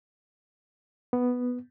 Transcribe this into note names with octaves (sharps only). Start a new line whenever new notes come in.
B3